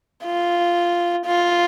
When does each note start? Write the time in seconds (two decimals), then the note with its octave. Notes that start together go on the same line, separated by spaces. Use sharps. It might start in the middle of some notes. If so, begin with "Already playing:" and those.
0.25 F4
1.26 F4